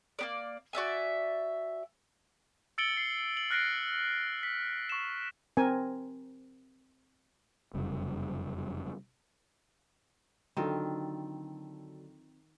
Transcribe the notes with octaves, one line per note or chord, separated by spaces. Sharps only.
A#3 B3 D5
F#4 D5 E5 G#5
E6 A6 C#7 D7 F#7 G7
C7
F#7
F6 F#6 A#6 C7 D7
B6
C#6 E7
C4 A#4 G#5
F1 F#2 C#3 G3
D3 D#3 F#3 C4 F4 A4